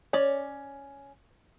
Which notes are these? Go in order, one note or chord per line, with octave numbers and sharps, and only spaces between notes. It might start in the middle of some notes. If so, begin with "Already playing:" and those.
C#4 C#5 D5